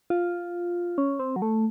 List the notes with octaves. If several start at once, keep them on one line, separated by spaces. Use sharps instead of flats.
F4
C#4
C4
F#3
A3